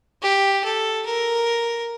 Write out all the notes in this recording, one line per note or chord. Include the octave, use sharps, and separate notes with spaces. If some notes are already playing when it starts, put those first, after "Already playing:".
G4
A4
A#4